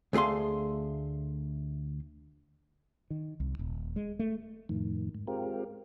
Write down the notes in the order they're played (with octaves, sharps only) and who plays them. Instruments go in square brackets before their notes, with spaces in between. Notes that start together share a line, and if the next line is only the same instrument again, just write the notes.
[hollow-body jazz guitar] D2 A3 G#4 F5 C6
[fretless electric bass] D#3
C2
D#1
G#3
A3
[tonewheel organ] F2 A2 D#3
G#2
G#3 C4 F4 G4 A#4